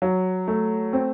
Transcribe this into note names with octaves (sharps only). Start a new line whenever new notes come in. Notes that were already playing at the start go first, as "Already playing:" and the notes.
F#3
A3
C4